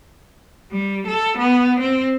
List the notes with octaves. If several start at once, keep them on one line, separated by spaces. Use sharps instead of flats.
G3
A4
B3
C4